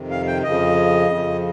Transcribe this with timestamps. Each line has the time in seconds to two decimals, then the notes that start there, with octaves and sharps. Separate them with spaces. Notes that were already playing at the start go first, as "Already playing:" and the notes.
Already playing: F2 C3 D#3
0.10 F5
0.27 G5
0.44 F2 C#3 F3 D#5
1.11 F2 C#3 F3